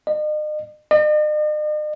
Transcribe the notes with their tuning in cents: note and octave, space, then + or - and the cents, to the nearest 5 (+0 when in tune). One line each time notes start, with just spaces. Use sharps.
D#5 -40
D#5 -45